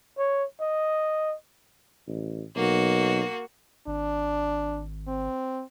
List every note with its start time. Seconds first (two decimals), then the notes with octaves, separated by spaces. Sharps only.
0.18 C#5
0.61 D#5
2.07 A1
2.56 B1 A#3 F#4
3.87 G#1 D4
5.07 C4